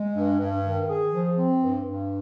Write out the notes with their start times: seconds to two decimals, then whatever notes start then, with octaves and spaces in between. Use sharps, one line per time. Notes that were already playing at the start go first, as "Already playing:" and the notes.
Already playing: G#3
0.15 G2
0.40 G2
0.64 D#3
0.88 G#4
1.12 F3
1.37 C4
1.61 G2
1.86 G2